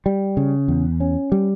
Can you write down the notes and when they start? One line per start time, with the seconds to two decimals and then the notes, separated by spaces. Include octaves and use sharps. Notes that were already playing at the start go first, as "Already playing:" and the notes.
0.06 G3
0.37 C#3
0.68 E2
1.00 C#4
1.32 G3